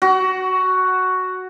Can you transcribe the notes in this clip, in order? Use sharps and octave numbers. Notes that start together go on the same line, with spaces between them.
F#4